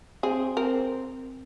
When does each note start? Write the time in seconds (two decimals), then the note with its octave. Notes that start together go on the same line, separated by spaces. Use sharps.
0.23 C4 G#4
0.57 C4 A#4